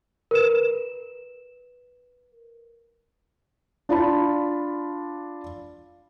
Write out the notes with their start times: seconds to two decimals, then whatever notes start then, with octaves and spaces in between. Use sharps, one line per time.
0.31 A#4 B4 E7
3.89 D4 F4 D5 B5